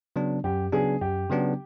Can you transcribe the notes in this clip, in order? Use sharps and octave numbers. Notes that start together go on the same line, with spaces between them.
C#3 F#3 B3 D4
F#2 G4
C#3 F#3 B3 D4 G#4
F#2 G4
C#3 F#3 B3 D4